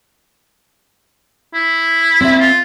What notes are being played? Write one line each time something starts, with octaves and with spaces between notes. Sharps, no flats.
E4
C4 E5
F4